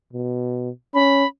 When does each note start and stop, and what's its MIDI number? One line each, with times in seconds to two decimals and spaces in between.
0.13 0.70 47
0.94 1.24 61
0.94 1.27 83